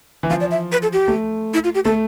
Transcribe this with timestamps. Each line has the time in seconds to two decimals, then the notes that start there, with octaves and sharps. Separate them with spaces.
0.23 E3
0.30 F3 F5
0.40 D5
0.51 E5
0.72 B4
0.82 A4
0.93 G4
1.08 A3
1.54 E4
1.64 F4
1.75 G4
1.85 A3 A4